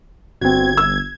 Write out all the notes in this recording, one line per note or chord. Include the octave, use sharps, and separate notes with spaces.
G1 C4 F#4 G#6
E6